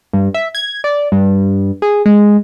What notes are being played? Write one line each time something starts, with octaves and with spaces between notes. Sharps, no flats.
G2
E5
G#6
D5
G2
G#4
G#3